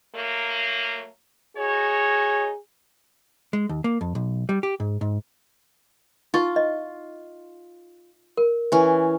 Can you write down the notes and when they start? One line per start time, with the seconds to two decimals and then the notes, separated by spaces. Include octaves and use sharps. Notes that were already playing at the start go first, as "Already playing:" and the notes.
0.15 F#3 A3 A#3
1.57 D#4 F#4 G#4 C#5
3.53 G#3
3.69 D#2
3.84 A#3
4.01 F2
4.15 B1
4.49 G3
4.63 G4
4.80 G#2
5.01 G#2
6.34 D#4 F4 C#6
6.56 D#5
8.37 A#4
8.72 E3 C#4